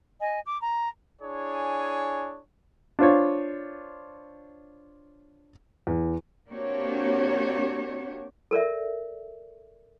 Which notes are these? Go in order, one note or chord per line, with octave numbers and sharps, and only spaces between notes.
D#5 G#5
D6
A#5
D4 E4 G#4 C#5 G#5
D4 F4 C5 C#5
E2
A#3 C4 D4 F#4 G4 C#5
A4 A#4 D5 E5